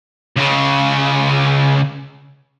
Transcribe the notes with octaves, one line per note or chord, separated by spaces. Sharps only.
C#2 C#3